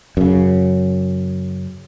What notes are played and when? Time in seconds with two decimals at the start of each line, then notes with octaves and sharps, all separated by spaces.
0.17 F#2 C#3